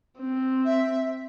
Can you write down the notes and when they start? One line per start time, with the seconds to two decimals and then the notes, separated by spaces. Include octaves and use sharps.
0.19 C4
0.65 E5